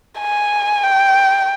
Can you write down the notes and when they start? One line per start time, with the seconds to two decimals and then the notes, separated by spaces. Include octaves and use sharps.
0.20 G#5
0.83 G5